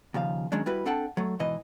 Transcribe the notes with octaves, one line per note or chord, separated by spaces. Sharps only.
D#2 C#3 F3 F5
D#3 F#3 G#3 C#4 D4
G3 E4 F#4 B4
C4 D4 A4 F#5 G5 A5
F#3 A3
G#2 B2 E3 D#5